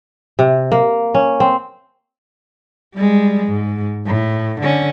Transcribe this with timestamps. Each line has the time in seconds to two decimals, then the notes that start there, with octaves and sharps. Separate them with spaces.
0.39 C3
0.72 A#3
1.15 C#4
1.40 C4
2.95 G3 G#3
3.47 G#2
4.06 A2
4.61 D3 C#4